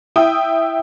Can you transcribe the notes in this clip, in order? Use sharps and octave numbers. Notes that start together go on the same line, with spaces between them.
E4 G5 D#6